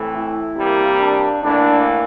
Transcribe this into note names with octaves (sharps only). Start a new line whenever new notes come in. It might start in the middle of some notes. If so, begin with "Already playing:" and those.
Already playing: A2 E3 A3 C4
E4
C3 G3 A#3
D4
A2 E3 A#3 D4